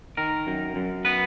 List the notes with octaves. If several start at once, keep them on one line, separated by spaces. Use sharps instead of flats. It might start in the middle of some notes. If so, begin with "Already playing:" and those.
D#3 A#4
F#2
F#2
B3 B4